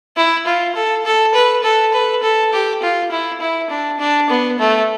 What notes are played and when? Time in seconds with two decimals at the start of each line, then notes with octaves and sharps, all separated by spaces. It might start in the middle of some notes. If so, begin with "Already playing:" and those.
0.16 E4
0.46 F4
0.75 A4
1.05 A4
1.34 B4
1.63 A4
1.94 B4
2.23 A4
2.53 G4
2.82 F4
3.11 E4
3.41 E4
3.70 D4
3.99 D4
4.30 B3
4.59 A3